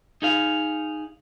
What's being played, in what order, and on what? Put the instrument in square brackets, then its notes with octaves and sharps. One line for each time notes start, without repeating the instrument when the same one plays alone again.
[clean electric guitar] D#4 G#4 F5